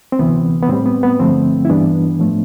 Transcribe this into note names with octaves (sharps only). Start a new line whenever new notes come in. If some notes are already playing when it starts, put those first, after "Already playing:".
C4
D2 C3 E3 B3
B3
A2 G3 C4
B3
B3
G2 D3 F3 A3 C4
E4
G2 E3 G3 B3 D4
A2 F3 A3